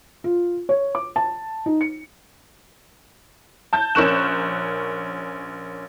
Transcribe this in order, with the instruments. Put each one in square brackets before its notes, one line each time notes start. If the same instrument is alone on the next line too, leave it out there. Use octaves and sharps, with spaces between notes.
[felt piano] F4
C#5
D6
A5
D#4
C#7
[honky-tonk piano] A5 G6
A#1 C#4 A#4 C#6 F#6 E7